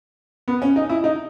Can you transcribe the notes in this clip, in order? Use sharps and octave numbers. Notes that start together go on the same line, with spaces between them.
B3
C#4
D#4
E4
D#4